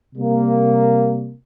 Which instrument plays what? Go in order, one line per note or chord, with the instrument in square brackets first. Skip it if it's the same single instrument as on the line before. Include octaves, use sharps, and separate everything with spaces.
[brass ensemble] C3 G3 A#3